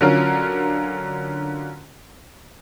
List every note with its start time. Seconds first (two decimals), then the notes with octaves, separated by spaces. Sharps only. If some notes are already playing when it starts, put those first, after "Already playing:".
0.01 D3 F#3 C#4 F4 A#4